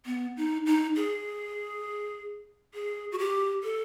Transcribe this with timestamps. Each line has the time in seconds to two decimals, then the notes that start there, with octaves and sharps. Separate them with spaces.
0.06 B3
0.37 D#4
0.66 D#4
0.96 G#4
2.74 G#4
3.12 F#4
3.19 G4
3.63 A4